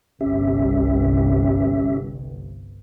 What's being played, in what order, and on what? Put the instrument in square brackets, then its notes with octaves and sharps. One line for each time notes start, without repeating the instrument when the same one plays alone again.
[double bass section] G1 C2 G2 [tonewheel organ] C#4 G4 E5